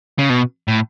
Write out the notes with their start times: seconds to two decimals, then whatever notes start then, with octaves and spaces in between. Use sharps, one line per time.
0.19 C#3
0.30 B2
0.68 A2